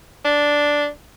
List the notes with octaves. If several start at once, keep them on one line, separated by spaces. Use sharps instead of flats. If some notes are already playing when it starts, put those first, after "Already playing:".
D4